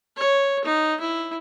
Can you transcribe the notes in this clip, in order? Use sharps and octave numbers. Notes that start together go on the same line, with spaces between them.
C#5
D#4
E4